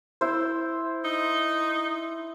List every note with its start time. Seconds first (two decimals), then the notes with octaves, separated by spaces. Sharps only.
0.21 E4 C5
1.05 D#4